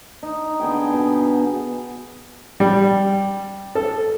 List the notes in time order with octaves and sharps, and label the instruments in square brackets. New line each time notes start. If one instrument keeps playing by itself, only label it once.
[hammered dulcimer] D#4
D3 B3 G#4 G5
B2
[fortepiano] G3
A4